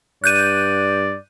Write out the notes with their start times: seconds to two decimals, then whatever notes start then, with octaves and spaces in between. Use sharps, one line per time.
0.24 G2 D5 F#6 G6 D#7